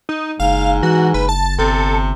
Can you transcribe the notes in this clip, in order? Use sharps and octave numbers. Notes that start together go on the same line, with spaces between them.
D#4
F#1 G#2 F5
E3 F#4
F#1 B4
A5
G1 C3 A4